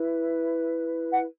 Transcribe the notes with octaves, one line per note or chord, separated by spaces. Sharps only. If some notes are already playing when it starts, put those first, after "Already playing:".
Already playing: E4 B4
F#5